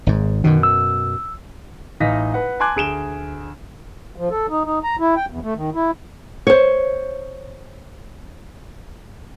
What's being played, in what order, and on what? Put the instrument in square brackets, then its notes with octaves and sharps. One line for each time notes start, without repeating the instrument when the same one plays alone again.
[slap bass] G#1 G#2
[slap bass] F#2 B2 [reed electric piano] D#3
[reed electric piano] E6
[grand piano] A1 D#4 D#5 F5 A#6 B6
B4 F#5
G#5 A5 C6 D6 F#6 G#6
D2 G#4 D7 E7 G7
[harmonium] F3
A4
D#4
D#4
A#5
E4
G5
E2
A3
D#3
E4
[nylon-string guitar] C5 C#5